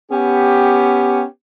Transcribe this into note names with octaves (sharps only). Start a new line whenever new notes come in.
B3 C#4 G4